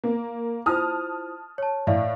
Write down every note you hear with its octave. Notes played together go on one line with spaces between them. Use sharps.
A#3
E4 F4 C5 A5 D#6 F6
C#5 A5
A2 D5 E5 F5